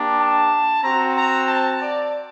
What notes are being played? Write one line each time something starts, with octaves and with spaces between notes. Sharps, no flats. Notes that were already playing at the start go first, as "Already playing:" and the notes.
Already playing: A#3 D4 G4
A5
C4 F#4 A#5
A#5
A5
D5